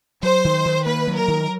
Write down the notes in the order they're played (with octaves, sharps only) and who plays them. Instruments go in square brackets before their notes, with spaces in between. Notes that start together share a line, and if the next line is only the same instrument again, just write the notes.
[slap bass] F#3 [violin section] C5
[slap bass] D#3
D#3
[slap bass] A#3 [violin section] B4
[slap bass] F#3
[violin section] A#4
[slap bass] D#3